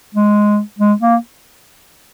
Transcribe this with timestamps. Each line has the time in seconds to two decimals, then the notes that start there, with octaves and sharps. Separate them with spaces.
0.15 G#3
0.79 G#3
1.01 A#3